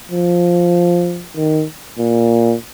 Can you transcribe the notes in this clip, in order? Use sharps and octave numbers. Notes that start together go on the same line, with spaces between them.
F3
D#3
A#2